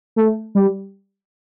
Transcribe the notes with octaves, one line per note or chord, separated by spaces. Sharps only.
A3
G3